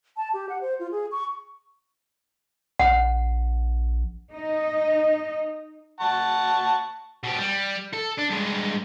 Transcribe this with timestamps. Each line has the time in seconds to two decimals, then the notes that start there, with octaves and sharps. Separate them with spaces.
0.17 A5
0.34 G4
0.49 F#5
0.61 C5
0.79 F4
0.91 G#4
1.12 C#6
2.79 A#1 F#5
4.32 D#4 D#5
6.00 F#5 A5 C#6
7.24 B2 G4
7.39 G3
7.93 A4
8.19 D4
8.30 G2 G#3